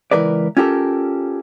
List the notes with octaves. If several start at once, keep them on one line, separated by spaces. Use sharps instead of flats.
C#2 E3 A#4 B4 D5
C#4 F4 G4 A4 A#4